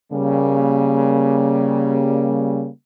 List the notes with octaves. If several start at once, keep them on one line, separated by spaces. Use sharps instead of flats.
C#3 G3 A#3